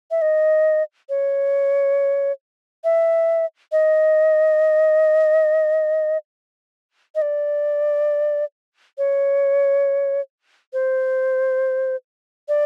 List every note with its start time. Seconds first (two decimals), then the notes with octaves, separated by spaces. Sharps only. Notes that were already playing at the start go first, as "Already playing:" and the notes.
0.11 E5
0.22 D#5
1.09 C#5
2.84 E5
3.72 D#5
7.15 D#5
7.22 D5
8.98 C#5
10.73 C5
12.48 D5